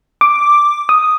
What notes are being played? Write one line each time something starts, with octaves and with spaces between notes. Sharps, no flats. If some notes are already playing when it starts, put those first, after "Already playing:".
D6
D#6